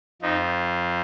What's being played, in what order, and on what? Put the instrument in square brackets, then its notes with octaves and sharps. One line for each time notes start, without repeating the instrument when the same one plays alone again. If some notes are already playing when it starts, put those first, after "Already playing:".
[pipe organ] F2 F3 D#4